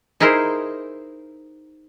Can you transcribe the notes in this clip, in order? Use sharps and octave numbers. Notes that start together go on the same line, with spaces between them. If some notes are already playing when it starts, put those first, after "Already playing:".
D#4 E4 G#4 A#4 C5